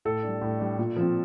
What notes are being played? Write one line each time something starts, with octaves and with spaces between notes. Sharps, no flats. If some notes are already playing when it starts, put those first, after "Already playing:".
A2 A4
G3 D4
A2
G3 D4
A#2
F3 C4